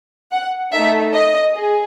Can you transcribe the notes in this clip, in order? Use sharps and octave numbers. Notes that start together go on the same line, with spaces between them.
F#5
A3 D#4 A4 E5
D#5
G#4